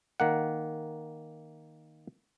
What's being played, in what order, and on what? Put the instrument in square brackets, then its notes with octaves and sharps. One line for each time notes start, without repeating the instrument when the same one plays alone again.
[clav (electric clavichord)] D#3 A#3 F#5